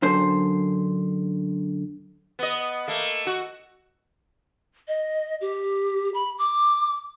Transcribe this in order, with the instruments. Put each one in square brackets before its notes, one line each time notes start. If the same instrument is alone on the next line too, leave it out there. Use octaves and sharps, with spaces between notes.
[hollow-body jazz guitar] F#2 D3 C5
[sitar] B3 D#5
A3 A#3
F#4
[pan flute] D#5
G4
B5
D6